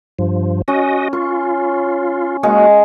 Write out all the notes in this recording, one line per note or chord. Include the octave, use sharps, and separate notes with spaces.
G2 F3
C#4 F#4 D#5
F4 C#6
G#3 A#3 F#4 G#4 F5